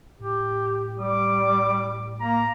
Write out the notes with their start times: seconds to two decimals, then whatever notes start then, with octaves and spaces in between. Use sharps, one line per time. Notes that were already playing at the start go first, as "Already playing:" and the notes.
0.20 A2 G4
0.99 G3 D6
2.21 A#3 A#5